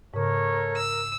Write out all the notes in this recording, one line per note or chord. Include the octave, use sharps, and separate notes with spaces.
G#2 C#3 A3 A#4 C#5
E6